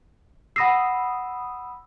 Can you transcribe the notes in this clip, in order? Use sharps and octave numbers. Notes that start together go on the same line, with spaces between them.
F#5 B5 D#6 E6 A#6 C7